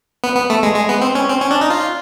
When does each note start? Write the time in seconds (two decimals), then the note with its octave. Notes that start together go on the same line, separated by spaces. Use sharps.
0.24 B3
0.36 B3
0.50 A3
0.63 G#3
0.76 G#3
0.89 B3
1.01 C4
1.15 C#4
1.29 C4
1.42 C#4
1.51 D4
1.61 D#4
1.70 F4